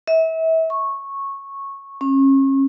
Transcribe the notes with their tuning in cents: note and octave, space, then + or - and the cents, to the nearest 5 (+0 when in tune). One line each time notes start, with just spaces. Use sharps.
E5 -35
C#6 -10
C#4 -35